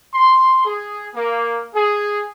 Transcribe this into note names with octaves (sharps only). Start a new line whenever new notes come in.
C6
G#4
A#3
G#4